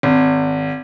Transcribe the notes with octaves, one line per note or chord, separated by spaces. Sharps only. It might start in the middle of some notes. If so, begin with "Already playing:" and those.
G#1